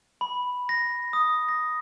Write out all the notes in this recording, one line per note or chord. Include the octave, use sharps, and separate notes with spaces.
B5
A#6
D#6
A#6